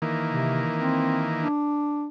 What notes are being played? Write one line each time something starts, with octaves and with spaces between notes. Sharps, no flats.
D#3 E3 A#3
C3
C4
D4